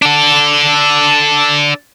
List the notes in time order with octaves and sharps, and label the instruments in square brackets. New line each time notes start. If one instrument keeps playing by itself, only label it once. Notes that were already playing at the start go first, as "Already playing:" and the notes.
[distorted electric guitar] D4 A4